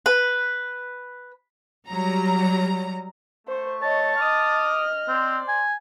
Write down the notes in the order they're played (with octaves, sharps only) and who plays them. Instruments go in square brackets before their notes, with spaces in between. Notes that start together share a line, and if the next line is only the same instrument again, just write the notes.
[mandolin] B4
[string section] F#3 G3 A#5
[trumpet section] A3 C#6 [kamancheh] C5
[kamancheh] C#5 D#5 [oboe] A5
[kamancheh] D#5 F6 [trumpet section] D6 D#6
[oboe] C4 [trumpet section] C5 D5 C6
[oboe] G#5